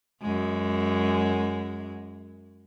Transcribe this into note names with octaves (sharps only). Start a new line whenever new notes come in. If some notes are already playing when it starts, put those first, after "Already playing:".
F#2 G#3